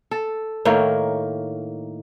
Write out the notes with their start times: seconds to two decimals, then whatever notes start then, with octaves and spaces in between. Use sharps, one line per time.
0.11 A4
0.65 A2 D#3 A#3 C#5